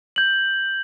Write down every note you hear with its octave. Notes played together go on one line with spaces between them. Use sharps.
G6 F#7